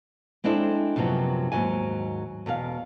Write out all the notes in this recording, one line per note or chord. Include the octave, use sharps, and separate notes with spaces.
G#3 C4 D4 E4 A4
F#2 C3 F3 F#3 B3
D#2 G#2 F#3 G#5
E2 B2 A4 F5